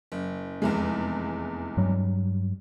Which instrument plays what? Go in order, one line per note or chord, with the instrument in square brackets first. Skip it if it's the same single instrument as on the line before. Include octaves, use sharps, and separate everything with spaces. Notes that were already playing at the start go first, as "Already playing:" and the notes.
[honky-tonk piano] F#1
F1 E2 G#3
[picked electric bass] G2 F#3 G3